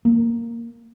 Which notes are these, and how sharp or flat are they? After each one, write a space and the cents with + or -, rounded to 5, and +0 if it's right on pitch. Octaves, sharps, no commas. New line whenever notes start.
A#3 -5